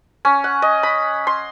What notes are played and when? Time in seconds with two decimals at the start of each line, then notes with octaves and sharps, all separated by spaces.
0.25 C#4
0.44 F#5
0.62 D#5
0.83 B5
1.27 C6